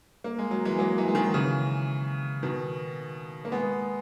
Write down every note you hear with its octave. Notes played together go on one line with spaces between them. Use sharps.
A#3
G#3
F#3
E3 G#3
F#3 A#3
E3 G#3
G#3
D#3 F#3
C#3 E3
B2 D#3
A#3
G#3 B3